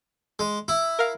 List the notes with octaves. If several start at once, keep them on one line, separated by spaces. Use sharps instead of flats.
G#3
E4
A#4 F5